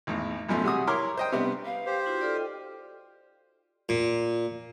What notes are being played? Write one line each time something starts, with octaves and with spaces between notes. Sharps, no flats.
G#1 E2 A2
A1 F#2 B2 F3 A3
C3 G3 F#4 G#4 D#6
E4 A#4 C#5 C6 D6 F6
C5 D#5 G5
C3 G3 B3 D4
B4 F5
G4 C5
D#4 F4 F#4
F4 A4 D5 F6
D#5 G5
A#2